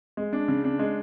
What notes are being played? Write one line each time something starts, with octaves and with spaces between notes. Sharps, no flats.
G#3
D4
C#3
D4
G#3